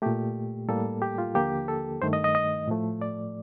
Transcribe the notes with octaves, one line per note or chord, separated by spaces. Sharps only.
A#2 A3 G4
A2 G3 A#3 A4
G4
F4
D#2 D3 F3 A#3 G4
A4
G2 D#3 A3 C5
D#5
D#5
D#5
A2 F3 A3
D5